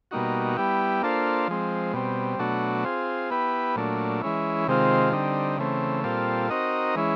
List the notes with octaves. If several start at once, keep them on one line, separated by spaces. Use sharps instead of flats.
B2 G3 A#3 D#4 F#4
G3 B3 E4 G4
A#3 D4 F4 A4 C5
F3 G#3 C4
B2 G3 C4
B2 F#3 A3 D4 F#4
C4 F4 G#4
B3 E4 G4 B4
A#2 F#3 A3 D4
E3 G#3 C#4 E4
C3 D#3 G#3 C4 F4
D3 G3 C4 D#4
C#3 E3 A3 C4
A#2 G3 C4 F4 A4
C4 D#4 F#4 A#4 D#5
E3 G#3 C#4 E4